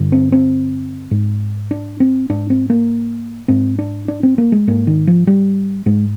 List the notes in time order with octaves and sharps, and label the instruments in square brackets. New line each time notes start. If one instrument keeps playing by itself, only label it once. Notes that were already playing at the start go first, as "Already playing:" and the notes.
Already playing: [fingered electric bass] G2 D3
C4
C4
G#2
D4
C4
G#2 D4
C4
A#3
G#2 C4
D4
D4
C4
A#3
G#3
G#2 A#3
D#3
F3
G3
G#2 G#3